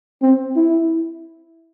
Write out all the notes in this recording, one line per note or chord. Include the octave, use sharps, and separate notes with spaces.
C4
E4